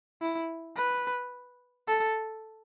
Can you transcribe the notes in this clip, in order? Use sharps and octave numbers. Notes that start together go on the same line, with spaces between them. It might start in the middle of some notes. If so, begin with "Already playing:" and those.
E4
B4
A4